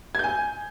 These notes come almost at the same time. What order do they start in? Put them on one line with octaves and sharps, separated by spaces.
G#6 G6 G#5